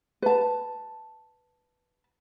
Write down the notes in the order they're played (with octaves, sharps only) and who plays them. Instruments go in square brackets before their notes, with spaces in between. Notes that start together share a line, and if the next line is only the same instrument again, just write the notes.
[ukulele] B4 A5